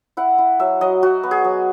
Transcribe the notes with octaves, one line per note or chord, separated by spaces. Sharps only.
E4 F#5
E4
F#3 E5
F#3 D#5
F#3 F#4
B3
G#4
F#3